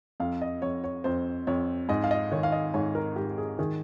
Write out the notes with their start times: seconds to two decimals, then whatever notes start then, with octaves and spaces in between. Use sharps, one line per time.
0.20 F2 F5
0.41 D#5
0.62 F2 C#5
0.84 C#5
1.04 F2 C5
1.47 F2 C#5
1.89 G#2 D#5
2.04 F5
2.11 D#5
2.32 D#3 C#5
2.43 F5
2.52 D#5
2.74 G#2 C#5
2.95 A#4
3.16 G#2 G4
3.38 G#4
3.59 D#3 G#4